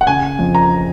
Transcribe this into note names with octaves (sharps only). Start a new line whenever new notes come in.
F#5
C#3 G#5
F2
A#5